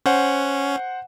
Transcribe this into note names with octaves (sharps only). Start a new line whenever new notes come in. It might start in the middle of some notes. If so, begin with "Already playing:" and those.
C#4 C5 F#5